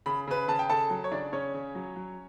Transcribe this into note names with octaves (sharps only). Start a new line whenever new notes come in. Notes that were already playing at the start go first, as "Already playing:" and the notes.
C#3 B5
C#3 B4 B5
C#3 A5
G5
C#3 A4 A5
F#3
C#5
C#3 D4 D5
C#3 C#4 C#5
C#3
F#3
F#3